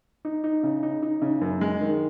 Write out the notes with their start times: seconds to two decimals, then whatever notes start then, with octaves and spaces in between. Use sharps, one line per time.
0.25 D#4
0.44 D#4
0.63 C#3
0.83 D#4
1.03 D#4
1.22 C#3
1.41 F#2
1.61 G#3
1.81 D#3